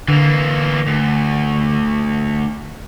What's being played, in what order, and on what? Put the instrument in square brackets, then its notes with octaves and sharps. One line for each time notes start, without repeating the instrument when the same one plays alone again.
[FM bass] D3 [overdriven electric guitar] E3 A#3
[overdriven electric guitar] D2